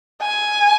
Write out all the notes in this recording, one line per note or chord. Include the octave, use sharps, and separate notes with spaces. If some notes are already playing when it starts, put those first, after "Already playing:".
G#5